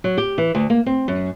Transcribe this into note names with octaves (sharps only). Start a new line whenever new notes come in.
F#3
G4
E3
D2
A#3
C4
F#2